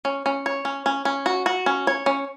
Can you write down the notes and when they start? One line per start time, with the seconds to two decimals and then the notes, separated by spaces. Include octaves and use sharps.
0.05 C#4
0.26 C#4
0.46 C#5
0.65 C#4
0.86 C#4
1.05 C#4
1.26 F#4
1.46 F#4
1.66 C#4
1.87 C#5
2.06 C#4